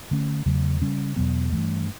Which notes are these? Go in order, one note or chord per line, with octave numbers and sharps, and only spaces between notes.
D3 A3 C#4
E2 C#3 F#3 A3
C#3 G3 C#4
E2 B2 F#3 B3
G2 E3 A3